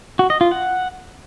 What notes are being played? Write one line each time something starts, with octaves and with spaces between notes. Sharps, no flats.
F#4
D#5
F4
F#5